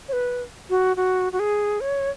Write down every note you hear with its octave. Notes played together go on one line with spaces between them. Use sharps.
C#5
B4
F#4
F#4
F#4
G#4
C#5